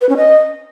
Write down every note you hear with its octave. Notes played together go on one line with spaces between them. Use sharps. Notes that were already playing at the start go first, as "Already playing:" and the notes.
B4
C#4
D#5